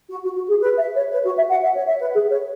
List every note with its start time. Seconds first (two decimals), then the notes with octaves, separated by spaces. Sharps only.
0.10 F#4
0.23 F#4
0.35 F#4
0.48 G#4
0.61 B4
0.78 E5
0.95 C#5
1.11 B4
1.24 F#4
1.37 E5
1.50 F#5
1.62 E5
1.75 C#5
1.88 E5
2.00 B4
2.14 G#4
2.30 C#5